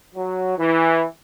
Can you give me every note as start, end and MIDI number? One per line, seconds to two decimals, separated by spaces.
0.15 0.57 54
0.57 1.04 52